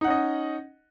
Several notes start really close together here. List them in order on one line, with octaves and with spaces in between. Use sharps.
D#4 F#5 C#4 D#5